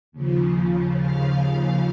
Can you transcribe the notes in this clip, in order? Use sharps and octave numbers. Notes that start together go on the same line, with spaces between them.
D#2 C#3 F3
F5